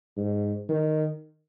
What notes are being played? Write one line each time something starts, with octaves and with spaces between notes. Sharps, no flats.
G#2
D#3